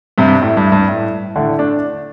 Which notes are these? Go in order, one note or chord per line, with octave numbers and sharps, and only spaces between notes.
G2 C3
A2
G2
G2
A2
A2 D3
A3 D4